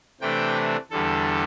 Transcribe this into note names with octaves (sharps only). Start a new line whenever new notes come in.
C3 E3 A3 D4 G5
E2 D3 G3 A4